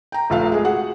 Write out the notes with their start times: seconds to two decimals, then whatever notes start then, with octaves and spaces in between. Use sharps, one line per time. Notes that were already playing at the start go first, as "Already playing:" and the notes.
0.12 G5 A#5
0.30 F1 A#1 A4 E5 F5
0.52 G#3 G#4
0.65 F#4 G#4 F#5